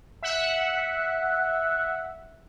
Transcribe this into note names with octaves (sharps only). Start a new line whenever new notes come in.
E5 F#5